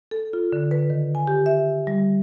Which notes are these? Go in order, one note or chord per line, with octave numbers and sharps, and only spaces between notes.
A4
F4
D3
B4
D#3
G#5
G4
E5
G3